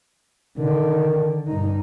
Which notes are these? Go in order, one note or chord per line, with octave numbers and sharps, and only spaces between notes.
D3 D#3
G2 D#4